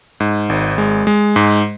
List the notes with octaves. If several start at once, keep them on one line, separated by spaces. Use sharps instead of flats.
G#2
G#1
G#3
G#3
G#2